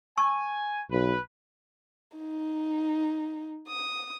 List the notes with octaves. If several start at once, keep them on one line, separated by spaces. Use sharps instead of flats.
G#5 A5 C#6 E6
B1 B4
D#4
D#6